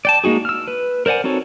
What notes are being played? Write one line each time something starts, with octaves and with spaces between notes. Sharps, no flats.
D5 G5 A5
G#3 A#3 D#4 F#4 G#4
E6 F6
B4
A#4 C5 D5 F#5 G#5
C4 D#4 F#4 A4 C#5